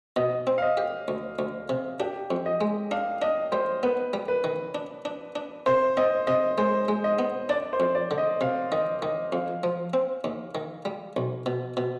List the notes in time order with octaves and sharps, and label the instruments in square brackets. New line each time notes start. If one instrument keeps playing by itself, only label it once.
[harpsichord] B2 [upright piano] D#5
[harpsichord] C4
[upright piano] F5
D#5
[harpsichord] G4
D2
D2
C3
[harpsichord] D4 [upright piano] G4
[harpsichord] F2
[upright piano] D#5
[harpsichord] G#3
[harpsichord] D4 [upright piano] F5
[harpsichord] D4 [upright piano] D#5
[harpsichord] G3 [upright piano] C5
[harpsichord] B3 [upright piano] B4
[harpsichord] G3
[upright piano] B4
[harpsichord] D#3
D4
D4
D4
[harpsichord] C3 [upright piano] C5
[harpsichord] C4 [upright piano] D#5
[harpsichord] C3 [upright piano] D#5
[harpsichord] G#3 [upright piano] C5
[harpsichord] G#3
[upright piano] D#5
[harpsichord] B3
[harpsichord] D4 [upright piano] D5
[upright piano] C5
[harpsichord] F2
[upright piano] D5
[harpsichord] D3
[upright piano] D#5
[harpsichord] C3 [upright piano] F5
[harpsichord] D#3 [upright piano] D#5
[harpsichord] D#3 [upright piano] D#5
[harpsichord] F2 [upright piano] F5
[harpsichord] F3
C4
D#2
D#3
G3
B1
B2
B2